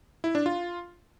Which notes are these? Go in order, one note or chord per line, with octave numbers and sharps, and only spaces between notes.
E4
D4
F4